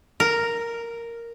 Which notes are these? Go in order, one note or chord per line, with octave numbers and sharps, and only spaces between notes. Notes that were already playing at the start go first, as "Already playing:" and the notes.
A#4